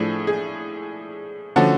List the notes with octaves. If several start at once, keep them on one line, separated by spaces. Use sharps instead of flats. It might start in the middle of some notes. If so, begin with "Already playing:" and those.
Already playing: A2 F3 A3 D4 G#4
G#4
D3 F3 A3 C#4 F#4 A4